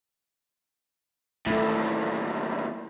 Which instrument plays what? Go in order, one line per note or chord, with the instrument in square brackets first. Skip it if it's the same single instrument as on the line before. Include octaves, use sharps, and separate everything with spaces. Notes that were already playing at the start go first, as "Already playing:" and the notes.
[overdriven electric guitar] D#2 A2 [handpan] A3 E4